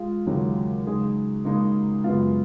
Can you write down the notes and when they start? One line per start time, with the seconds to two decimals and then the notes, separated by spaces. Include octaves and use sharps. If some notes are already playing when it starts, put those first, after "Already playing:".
Already playing: G#3 F4
0.27 D#2 C#3 F#3 G#3
0.86 C#3 G#3 D#4 G#4
1.45 C#3 G#3 A#3 D#4 G#4
2.04 F#2 C#3 G#3 B3 F4